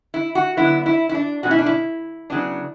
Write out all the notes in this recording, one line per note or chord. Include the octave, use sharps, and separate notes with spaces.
E4
F#4
D3 F#3 B3 E4
E4
E4
D4
B2 A3 C#4 F#4
E4
D4
E4
C#3 F#3 B3 D4